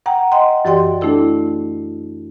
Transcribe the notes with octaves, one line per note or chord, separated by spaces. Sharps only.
F#5 G5 A#5
D#5 F#5 G5 C6
F#2 E3 G4 D5 G5 C6
A3 D4 E4 A4